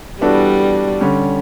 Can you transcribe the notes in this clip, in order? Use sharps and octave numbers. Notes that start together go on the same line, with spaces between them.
E3 G3 B3 D4 F#4 A4
D3 G3 C#4